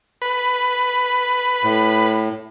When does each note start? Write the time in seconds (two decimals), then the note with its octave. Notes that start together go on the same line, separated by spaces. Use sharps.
0.22 B4
1.63 A2